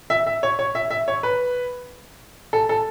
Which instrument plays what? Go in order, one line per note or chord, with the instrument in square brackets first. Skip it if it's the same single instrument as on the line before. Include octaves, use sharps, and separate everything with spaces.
[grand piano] E5
E5
C#5
C#5
E5
E5
C#5
B4
A4
A4